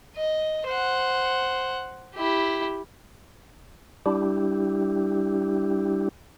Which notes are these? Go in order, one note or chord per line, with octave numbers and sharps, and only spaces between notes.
D#5
C5 F#5
E4 G4
G3 D4 E4 G4